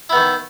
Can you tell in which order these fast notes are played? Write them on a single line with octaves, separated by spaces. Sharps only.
E4 B3 D#3